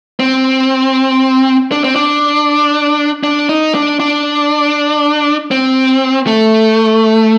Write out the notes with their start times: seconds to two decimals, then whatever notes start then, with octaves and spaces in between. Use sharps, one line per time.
0.20 C4
1.72 D4
1.84 C4
1.96 D4
3.23 D4
3.49 D#4
3.75 D4
4.00 D4
5.51 C4
6.27 A3